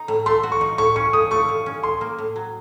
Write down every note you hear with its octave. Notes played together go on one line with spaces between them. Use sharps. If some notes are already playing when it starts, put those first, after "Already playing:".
Already playing: D#4 A#5
A2
A3 C6
F#4
C#6
D#4
A2 C#6
C#4 C#6
A2 D#6
A3 C#6
A2
C#4
A2 C6
A#3
A2
F#3